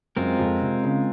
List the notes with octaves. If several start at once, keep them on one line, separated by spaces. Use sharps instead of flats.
F#2 G#3 C4 F4 A#4
F2
C3
C#3